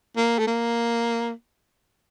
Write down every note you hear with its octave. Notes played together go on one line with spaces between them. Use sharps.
A#3
A3
A#3